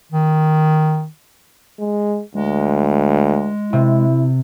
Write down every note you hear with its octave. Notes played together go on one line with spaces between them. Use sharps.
D#3
G#3
D2 G#3
C3 E4